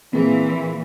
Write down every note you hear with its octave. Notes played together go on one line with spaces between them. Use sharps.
A#2 E3 C4 G#4 A#4